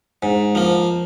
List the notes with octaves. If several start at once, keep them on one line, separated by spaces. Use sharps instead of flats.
G#2
F3 A#3